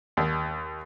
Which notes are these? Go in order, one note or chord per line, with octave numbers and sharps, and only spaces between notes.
D#2